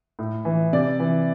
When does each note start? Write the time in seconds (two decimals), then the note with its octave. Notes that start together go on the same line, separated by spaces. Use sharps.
0.19 A2
0.45 E3
0.73 C3 D5
1.00 E3